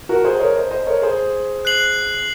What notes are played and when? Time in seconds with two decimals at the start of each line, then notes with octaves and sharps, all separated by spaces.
0.09 F#4 A#4
0.25 G#4 C5
0.40 A#4 C#5
0.56 C5 D#5
0.71 C5 D#5
0.87 A#4 C#5
1.02 G#4 C5
1.65 F#6 C7 F#7